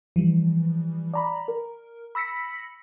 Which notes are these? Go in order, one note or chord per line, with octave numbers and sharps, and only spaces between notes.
E3 F3 G3
D5 A#5 B5
A#4
B5 E6 A#6 B6 C#7